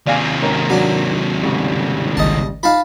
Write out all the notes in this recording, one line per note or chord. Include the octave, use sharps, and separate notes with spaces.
D#2 C3 D5 F5 G#5
G#2 D#3 C#4 A#4
F#3 D4
G#2 C#3 G3
G#1 C#2 D#3 D#5 A5
D#4 F4 F5 A5 B5